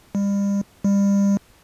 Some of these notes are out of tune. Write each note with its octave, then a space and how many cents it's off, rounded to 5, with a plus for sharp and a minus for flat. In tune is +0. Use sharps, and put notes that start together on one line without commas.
G3 +35
G3 +30